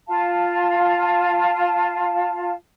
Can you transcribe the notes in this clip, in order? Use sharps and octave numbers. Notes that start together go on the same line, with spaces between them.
F4 F5 A5